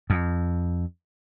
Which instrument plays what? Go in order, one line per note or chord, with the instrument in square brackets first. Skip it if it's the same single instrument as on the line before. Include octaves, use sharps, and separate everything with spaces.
[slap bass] F2